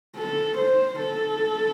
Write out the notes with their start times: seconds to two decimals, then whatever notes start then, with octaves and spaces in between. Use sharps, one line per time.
0.18 A4
0.58 C5
0.99 A4